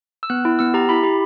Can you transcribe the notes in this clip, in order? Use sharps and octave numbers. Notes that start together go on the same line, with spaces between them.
E6
B3 F#6
E4
B3 E6
G4 A#5
E4 B5
G4